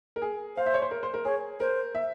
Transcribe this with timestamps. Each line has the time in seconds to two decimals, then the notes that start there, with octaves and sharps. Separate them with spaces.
0.16 A#4
0.22 G#4
0.56 C5 F5
0.66 E5
0.74 C#5
0.82 C5
0.91 A#4
1.03 C5
1.14 A#4
1.25 G#4 C#5
1.60 A#4 C5
1.95 E5